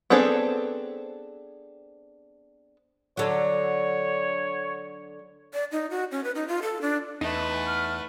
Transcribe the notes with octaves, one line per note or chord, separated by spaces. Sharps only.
B3 C4 D4 G#4 A4
D3 F#3 C#5
D5
D#4
F#4
C#4
B4
D#4
F4
A4
D4
E2 A3 D#4 B4
F6